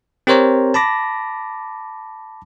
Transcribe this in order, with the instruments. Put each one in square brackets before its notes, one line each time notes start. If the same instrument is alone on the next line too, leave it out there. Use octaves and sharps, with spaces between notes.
[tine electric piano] C4 G4 A#4 C5 C#5 A#5
A5 B5 D6 A#6